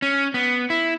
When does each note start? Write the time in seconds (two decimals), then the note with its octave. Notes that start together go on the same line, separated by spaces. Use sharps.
0.02 C#4
0.34 B3
0.70 E4